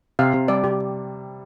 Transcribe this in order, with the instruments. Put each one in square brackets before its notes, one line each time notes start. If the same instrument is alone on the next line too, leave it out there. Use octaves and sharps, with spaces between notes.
[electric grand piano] C3 [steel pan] F5
[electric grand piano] C3
[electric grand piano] G3 [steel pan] D5
[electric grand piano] C3 [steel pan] G4